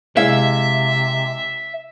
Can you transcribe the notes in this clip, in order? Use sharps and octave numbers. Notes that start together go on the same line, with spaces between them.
C3 G#3 E4 E5 F5